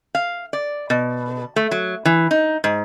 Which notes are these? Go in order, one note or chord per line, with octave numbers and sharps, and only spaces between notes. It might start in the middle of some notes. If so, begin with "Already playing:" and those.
F5
D5
B2
A3
F#3
E3
D#4
G#2